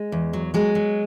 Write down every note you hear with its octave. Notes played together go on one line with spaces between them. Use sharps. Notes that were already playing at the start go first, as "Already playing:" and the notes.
Already playing: G#3
E2
F#3
F#3 G#3
F#3